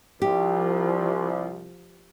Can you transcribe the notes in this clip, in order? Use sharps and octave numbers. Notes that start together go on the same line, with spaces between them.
C2 F3 G4